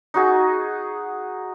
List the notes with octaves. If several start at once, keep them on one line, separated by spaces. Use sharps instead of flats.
D#4 F#4 G#4